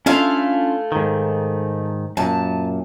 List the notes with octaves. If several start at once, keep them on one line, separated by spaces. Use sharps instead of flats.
A3 C#4 D4 E4 F4 F5
G#2 D#3
F#2 A#2 A5